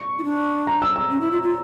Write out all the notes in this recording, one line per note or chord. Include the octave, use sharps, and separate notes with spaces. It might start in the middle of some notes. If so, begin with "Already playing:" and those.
Already playing: C#6
E4
D4
A#5
E6
E6
C#4
E4
F4
F4